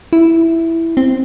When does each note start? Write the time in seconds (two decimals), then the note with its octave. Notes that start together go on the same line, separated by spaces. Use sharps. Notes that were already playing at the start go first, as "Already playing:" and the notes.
0.13 E4
0.97 C4